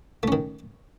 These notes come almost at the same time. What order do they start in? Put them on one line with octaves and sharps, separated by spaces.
A3 C#4 D#3